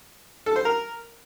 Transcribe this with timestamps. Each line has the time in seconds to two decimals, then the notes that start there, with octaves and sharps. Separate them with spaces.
0.46 A4
0.56 C5
0.65 A#4